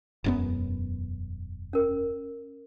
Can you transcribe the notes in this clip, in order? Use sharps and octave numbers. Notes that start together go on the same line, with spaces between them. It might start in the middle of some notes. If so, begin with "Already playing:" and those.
E1 F#2 B3
C#4 A#4